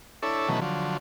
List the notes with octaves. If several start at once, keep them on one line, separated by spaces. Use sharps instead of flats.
D4 E4 A4 C#5
B2 D#3 E3 F#3 A3 C#4
D3 F3 F#3